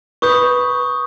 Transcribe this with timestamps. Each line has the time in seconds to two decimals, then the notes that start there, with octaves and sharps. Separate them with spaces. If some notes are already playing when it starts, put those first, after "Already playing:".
0.22 B4 C#6 D#6 G6